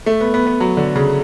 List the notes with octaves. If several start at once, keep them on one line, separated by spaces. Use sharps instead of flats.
A3
B3
B3
B3
F#3
D3
C#3